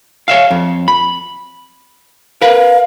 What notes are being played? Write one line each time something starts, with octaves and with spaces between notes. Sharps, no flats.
C#5 E5 F5
F2
B5
A#4 B4 F5